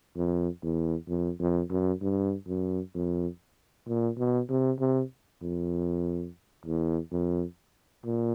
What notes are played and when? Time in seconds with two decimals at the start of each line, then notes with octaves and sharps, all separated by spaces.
0.16 F2
0.63 E2
1.09 F2
1.40 F2
1.70 F#2
2.01 G2
2.47 F#2
2.95 F2
3.87 A#2
4.18 B2
4.49 C3
4.80 C3
5.42 F2
6.65 E2
7.11 F2
8.05 A#2